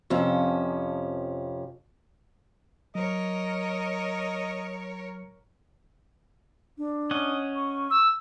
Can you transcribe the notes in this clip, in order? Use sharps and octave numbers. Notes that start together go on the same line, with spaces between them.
F2 C3 F3 C#4
F#3 A#4 C#5 D#5
D4
C#4 D#5 F#5
C#6
E6